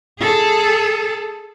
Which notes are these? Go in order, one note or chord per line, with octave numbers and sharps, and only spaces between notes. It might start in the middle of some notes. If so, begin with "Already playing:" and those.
G#4 A4